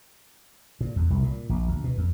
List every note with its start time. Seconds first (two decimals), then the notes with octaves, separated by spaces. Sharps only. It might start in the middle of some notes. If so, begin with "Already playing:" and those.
0.81 A#2
0.96 E2
1.10 C2
1.23 A#2
1.49 A#1
1.68 D2
1.84 B2
1.98 F2